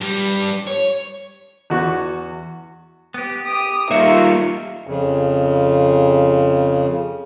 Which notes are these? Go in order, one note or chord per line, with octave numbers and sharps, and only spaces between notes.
G2 G3
C#5
E2 F#4 C#6
B3 G4
G4 D#6
G3 A#3 D#4 F4 F#4 E5
F2 C#3